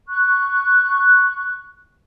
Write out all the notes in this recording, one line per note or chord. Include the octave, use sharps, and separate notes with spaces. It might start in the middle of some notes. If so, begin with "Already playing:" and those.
C#6 F#6